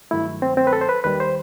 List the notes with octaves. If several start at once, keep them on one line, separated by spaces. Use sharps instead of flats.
G2 D#3 F#3 A3 E4
C4
C4
B4
A4
C5
B4
D#2 D#3 G3 B4
C5